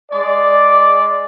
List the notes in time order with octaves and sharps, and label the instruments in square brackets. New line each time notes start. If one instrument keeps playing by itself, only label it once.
[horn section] G#3 D5